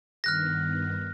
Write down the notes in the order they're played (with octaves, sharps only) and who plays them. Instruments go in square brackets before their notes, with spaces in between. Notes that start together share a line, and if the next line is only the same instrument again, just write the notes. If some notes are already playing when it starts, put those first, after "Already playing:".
[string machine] G2 D#3 B3 [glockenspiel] F6 F#6 A#6